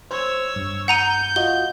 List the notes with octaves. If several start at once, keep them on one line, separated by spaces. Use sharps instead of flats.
C5 C#5 E6
G2
F#5 A#5 G6 D#7
F4 F#4 D#5 G7